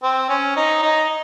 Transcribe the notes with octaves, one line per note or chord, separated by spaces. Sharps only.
C4
C#4
D#4
D#4